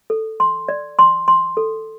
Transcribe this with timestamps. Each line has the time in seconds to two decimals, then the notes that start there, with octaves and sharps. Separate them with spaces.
0.10 A4
0.40 C6
0.68 D5
0.99 C6
1.28 C6
1.57 A4